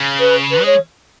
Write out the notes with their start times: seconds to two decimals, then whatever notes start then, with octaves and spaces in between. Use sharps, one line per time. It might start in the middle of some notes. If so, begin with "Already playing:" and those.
Already playing: C#3
0.20 B4
0.51 B4
0.62 G#3 C#5